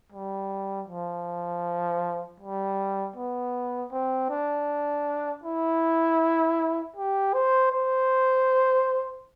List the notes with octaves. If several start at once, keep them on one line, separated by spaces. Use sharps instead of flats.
G3
F3
G3
B3
C4
D4
E4
G4
C5
C5